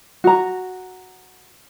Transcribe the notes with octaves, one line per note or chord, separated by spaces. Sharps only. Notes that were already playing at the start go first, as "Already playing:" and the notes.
F#4 A#5